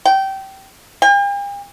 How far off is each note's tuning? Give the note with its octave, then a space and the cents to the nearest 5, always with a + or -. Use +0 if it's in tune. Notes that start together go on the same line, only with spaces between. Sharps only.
G5 -20
G5 +45